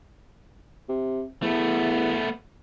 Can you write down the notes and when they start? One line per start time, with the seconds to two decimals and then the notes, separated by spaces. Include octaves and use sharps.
0.89 C3
1.42 E2 A3 B3